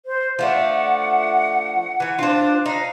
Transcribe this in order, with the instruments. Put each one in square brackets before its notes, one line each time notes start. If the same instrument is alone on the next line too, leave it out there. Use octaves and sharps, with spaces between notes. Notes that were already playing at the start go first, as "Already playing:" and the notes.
[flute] C5
[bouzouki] F3 A3 D4 [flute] F#5
[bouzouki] E3 G#5
[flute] D4 [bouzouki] F4 C5
[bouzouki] D#4 [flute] F5